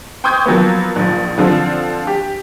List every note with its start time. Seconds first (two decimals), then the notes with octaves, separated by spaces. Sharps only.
0.24 G5 C6 C#6 D#6 G6 G#6
0.46 F3 F#3 A#3 B3
0.96 A#1 F3
1.38 D3 F3 C4
2.07 G4